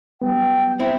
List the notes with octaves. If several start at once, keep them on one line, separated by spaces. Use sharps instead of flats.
F#3 G3 B3 G5
C4 E4